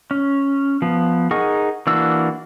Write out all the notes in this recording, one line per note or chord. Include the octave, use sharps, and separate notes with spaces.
C#4
F3 B3
D#4 G#4 A#4 F#5 C#6
E3 A#3 D4 F#4 E6